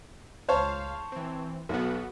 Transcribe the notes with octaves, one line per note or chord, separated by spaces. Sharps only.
C#2 C5 C#5 F5 A5
E3 C4
B1 B3 F#4